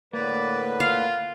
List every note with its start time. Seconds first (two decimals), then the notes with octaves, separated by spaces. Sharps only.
0.13 A2 D3 A#3 B4 D5
0.80 F4 F5